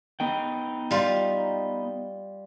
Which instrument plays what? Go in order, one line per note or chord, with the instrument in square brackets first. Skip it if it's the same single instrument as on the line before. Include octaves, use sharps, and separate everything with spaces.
[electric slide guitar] B3 D#4 G5
[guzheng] G3 F4